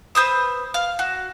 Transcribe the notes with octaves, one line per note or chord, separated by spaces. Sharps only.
B4 C5 D#6 E6
F5
F#4